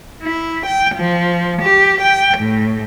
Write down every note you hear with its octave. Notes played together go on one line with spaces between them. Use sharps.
E4
G5
F3
G4
G5
A2